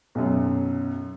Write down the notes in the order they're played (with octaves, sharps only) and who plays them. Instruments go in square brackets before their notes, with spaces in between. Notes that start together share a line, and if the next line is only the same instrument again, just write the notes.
[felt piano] B1 F#2